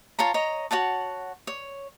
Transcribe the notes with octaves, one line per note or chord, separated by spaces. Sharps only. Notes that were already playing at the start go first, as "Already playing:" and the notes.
F4 C#5 A5 A#5
C#5 D#5 A#5
F#4 C#5 F#5 A5
C#5